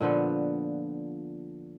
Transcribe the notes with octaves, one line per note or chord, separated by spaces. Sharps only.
A#2 D3 F3 B3